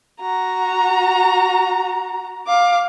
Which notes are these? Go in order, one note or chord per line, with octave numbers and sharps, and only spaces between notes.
F#4 A#5
F5 D6